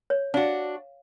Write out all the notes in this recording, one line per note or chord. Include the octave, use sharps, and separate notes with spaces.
C#5
D4 F#4 F5